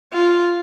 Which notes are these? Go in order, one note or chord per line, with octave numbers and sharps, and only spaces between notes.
F4